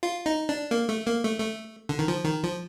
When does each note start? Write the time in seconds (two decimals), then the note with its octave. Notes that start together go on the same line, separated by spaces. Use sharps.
0.03 F4
0.26 D#4
0.49 D4
0.71 A#3
0.89 A3
1.06 A#3
1.24 A3
1.40 A3
1.89 D3
1.99 D#3
2.08 F3
2.25 D#3
2.43 F3